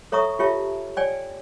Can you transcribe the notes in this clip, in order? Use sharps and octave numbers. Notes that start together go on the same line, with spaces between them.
A4 C#5 E5 A#5 C#6 D#6
F4 G4 C#5 E5 A5
C#5 D5 G5 G#5